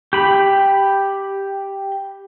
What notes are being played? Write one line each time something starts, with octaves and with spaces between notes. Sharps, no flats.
G4 B5